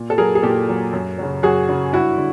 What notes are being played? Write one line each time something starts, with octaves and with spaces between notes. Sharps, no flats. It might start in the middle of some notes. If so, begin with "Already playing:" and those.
Already playing: A#2
A4
F#3 G#4 A#4
G#4
A#2 G4 A4
F#3
F#2
C#3 F#3
F#2 F#4 G#4
C#3 F#3
G2 E4 F#4
D3